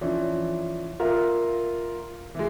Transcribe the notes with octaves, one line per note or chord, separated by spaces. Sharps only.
E3 F3 C#4 D4
F4 A#4 E5 F5
E3 G#3